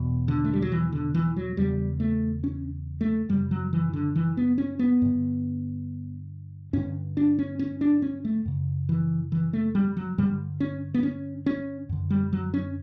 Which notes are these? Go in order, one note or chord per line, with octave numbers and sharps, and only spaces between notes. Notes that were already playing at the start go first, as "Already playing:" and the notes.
Already playing: E2 B2
D3
A3
G3
F#3
E3
D3
E3
F#3
E2 C#3 G3
A3
C#4
A3
F#2 C#3 G3
F#3
E3
D3
E3
B3
C#4
B3
G2 D3
G2 D3 C#4
D4
C#4
C#4
D4
C#4
A3
F#2 C#3
E3
E3
A3
G3
F#3
G2 D3 G3
C#4
B3
C#4
C#4
F#2 D3
G3
F#3
C#4